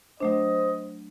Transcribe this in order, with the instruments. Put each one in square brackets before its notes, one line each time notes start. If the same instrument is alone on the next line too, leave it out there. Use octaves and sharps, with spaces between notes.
[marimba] F#3 A3 D4 [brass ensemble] C5 D#5